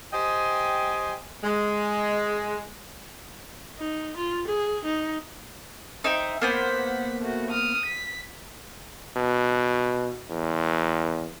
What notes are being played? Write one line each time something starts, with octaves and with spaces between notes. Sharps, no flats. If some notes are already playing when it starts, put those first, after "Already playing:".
G4 C5 D#5 G5 G#5
G#3
D#4
F4
G#4
D#4
D#4 C5 E5 G5
A#3 B3 C5 F#5 B6
A3 F#4
D#6 F6
B6
B2
E2